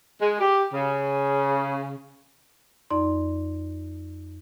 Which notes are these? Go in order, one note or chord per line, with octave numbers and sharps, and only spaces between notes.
G#3
G4
C#3
F2 D#4 D5 C6